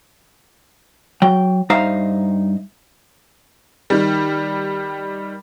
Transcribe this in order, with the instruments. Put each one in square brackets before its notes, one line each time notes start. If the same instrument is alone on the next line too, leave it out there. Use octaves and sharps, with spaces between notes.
[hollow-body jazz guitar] F#3 G5
G2 D#4 C5 E5 F5 A#5
[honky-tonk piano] D#3 G3